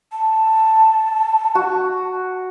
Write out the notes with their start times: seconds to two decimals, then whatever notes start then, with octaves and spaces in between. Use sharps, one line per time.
0.12 A5
1.55 F#4